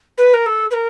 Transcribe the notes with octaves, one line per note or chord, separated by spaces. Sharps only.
B4
A#4
A4
B4
A#4